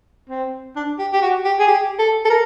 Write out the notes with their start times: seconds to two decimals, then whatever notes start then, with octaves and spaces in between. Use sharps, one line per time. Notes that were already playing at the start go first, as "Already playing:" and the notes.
0.30 C4
0.76 D4
0.99 G4
1.13 G4
1.22 F#4
1.45 G4
1.59 G#4
1.68 G4
1.99 A4
2.25 A4
2.30 A#4